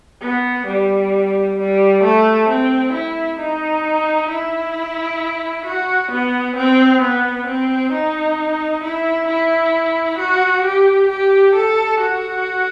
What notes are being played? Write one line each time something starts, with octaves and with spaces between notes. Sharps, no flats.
B3
G3
G3
A3
C4
E4
D#4
E4
F#4
B3
C4
B3
C4
D#4
E4
E4
F#4
G4
G4
A4
F#4